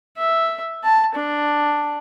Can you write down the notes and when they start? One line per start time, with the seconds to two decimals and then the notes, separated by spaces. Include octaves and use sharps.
0.18 E5
0.84 A5
1.15 D4